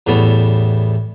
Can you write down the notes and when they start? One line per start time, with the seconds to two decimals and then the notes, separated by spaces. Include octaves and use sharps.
0.07 E2 A2 G3 B3 A4 C#5